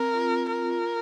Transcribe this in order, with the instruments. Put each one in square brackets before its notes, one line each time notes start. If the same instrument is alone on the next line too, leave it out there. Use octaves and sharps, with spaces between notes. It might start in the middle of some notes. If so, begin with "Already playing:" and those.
Already playing: [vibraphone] C4 [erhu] A#4
[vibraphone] F4
[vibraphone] F4 [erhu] A#4